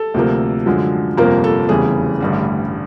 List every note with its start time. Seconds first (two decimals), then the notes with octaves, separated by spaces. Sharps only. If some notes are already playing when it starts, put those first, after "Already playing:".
Already playing: A4
0.14 D2 C3 F3 A#3
0.66 F#2 D3 F3 G#3
1.17 G1 F2 C3 F3 A#3 A#4
1.44 A4
1.69 F1 E2 C#3 E3 G3 G#4
2.20 A1 G2 D3 G3